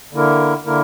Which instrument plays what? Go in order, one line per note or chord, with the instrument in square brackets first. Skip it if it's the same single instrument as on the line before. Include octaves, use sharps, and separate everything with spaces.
[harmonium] D3 A#3 E4 A#4
D3 A#3 E4 A#4